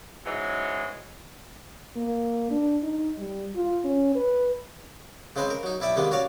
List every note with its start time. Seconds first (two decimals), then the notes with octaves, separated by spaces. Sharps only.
0.25 G#2 C#3 E3 F#3 G#3
1.96 A#3
2.51 D4
2.83 D#4
3.19 G3
3.56 F4
3.85 C#4
4.15 B4
5.36 C#3 G#3 C4 B4 C5 C6
5.50 A#4
5.63 F#3 D#4
5.80 B1 E4 D5 E5 G5
5.96 C3 D#3 G3 G#3 A#3 B3
6.11 C#4 F#4 C#5 D5 F5